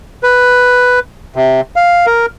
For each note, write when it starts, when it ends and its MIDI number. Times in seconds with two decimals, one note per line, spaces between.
0.23 0.99 71
1.36 1.61 48
1.76 2.06 77
2.06 2.26 70